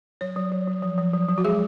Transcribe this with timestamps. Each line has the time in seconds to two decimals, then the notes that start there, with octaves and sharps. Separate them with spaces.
0.21 F#3 C#5
0.36 F#3
0.52 F#3
0.68 F#3
0.82 F3
0.98 F3
1.13 F#3
1.29 F#3
1.38 F#4
1.44 G#3 G#4